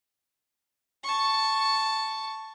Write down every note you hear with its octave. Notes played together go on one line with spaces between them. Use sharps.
A5 C#6